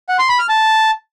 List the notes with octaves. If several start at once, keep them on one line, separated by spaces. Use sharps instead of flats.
F#5
C6
B5
F6
A5